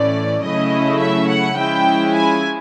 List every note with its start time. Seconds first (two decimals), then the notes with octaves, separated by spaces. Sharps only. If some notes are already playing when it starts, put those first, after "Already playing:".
Already playing: A2 E3 A3 C#4 D5
0.44 C#3 F#3 A3 C#4 E4 D#5
1.01 E5
1.29 F#5
1.57 F3 G#3 C#4 E4 G5
2.15 G#5